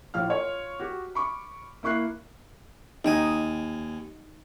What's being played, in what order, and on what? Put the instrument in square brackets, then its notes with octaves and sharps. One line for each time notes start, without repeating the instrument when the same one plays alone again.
[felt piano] A#1 A2 F5 F6
F4 C#5
F#4 G4
B5 C#6 D6
A#3 E4 C#6 F#6 C7
[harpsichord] D#2 G5 G#5 [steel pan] D#4